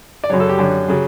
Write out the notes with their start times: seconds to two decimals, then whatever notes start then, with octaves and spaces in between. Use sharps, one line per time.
0.24 D5
0.30 F#2 C#3 F#3 C#5
0.40 A4
0.49 G4
0.59 F#2 D3 F#3
0.88 C#3 F#3